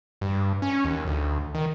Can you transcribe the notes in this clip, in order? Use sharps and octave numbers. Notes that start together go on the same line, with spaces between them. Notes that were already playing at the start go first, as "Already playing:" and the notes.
G2
C#4
D#2
D2
D#3